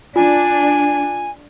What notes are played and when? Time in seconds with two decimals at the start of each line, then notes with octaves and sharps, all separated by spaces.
0.16 D4 F4 G#5